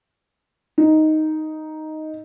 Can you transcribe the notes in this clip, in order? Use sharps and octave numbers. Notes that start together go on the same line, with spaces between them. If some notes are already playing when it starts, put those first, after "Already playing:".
D#4